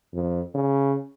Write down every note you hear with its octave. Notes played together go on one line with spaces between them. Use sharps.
F2
C#3